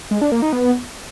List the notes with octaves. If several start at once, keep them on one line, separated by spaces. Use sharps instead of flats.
G#3
D4
A#3
D#4
B3